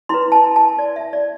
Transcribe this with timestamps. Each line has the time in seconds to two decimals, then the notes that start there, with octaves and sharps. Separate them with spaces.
0.09 E4 B4 C6
0.32 A5
0.56 A5
0.79 D5
0.96 E5
1.13 D5